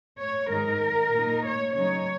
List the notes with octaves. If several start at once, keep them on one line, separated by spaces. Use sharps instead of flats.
C#5
G#2 D#3 G#3 D#4 A#4
A#2 A#3 D#4
C#5
C#3 F#3 D#4 C#5